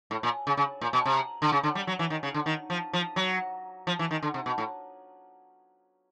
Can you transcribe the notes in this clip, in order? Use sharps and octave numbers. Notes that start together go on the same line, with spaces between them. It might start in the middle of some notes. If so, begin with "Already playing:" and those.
A2
A#2
C#3
C#3
A#2
B2
C3
D3
C#3
D3
G3
F#3
E3
D#3
C#3
D3
D#3
F3
F3
F#3
F3
E3
D#3
D3
C3
B2
A2